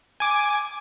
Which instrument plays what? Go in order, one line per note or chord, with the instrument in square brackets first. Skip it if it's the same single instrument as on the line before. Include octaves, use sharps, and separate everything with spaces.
[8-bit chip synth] G#5 D6